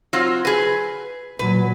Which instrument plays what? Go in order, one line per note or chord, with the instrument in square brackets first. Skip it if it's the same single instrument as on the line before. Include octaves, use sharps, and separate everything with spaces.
[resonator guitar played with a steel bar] F#3 C4 F4
G#4 B4
[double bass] A#2 F#3 [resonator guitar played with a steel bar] B4